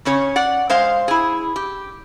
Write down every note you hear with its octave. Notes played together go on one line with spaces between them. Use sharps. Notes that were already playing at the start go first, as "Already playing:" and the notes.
C#3 C#4 C#5
D5 F#5
G#3 C5 F5
E4 G#4
G4